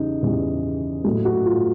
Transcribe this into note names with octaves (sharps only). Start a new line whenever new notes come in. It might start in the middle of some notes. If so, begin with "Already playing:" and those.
Already playing: E2 C#3 E3 G3 D#4
E2 C#3 E3 G3
A2 F#3 A3
F#4
F4